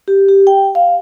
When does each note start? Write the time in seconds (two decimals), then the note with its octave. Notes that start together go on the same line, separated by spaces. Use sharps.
0.08 G4
0.28 G4
0.47 G5
0.75 F5